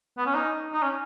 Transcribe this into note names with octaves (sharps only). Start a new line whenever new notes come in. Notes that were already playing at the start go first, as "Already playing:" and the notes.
B3
C#4
D#4
D#4
C#4